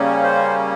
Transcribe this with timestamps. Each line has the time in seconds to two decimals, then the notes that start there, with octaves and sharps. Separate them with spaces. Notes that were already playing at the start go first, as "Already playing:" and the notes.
Already playing: C#3 G3 A#3 C#4
0.23 C5